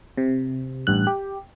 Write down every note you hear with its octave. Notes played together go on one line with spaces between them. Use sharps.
C3
A1 G2 F#6
G4